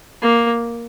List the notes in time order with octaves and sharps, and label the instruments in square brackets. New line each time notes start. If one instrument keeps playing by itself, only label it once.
[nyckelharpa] A#3